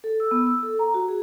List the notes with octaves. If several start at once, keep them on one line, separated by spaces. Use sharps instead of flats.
A4
E6
B3
E6
A4
A#5
F#4
G#4